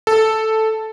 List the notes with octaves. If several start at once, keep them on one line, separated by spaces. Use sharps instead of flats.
A4